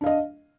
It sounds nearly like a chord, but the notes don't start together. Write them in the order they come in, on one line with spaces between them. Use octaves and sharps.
D4 F5 D#5